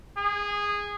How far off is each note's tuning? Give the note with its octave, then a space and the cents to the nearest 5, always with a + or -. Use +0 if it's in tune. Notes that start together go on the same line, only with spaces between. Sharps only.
G#4 -15